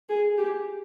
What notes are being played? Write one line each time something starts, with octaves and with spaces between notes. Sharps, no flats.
G#4
G4